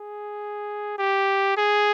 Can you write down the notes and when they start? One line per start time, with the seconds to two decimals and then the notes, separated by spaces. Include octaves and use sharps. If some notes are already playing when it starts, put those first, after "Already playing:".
Already playing: G#4
0.99 G4
1.57 G#4